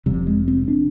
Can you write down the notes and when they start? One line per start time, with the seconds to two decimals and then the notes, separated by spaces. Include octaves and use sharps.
0.06 F1 F2 C3 G3
0.27 G#3
0.48 C4
0.68 D4